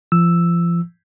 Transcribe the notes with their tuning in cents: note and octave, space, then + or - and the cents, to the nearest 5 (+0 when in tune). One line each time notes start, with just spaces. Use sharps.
F3 -35 E6 +0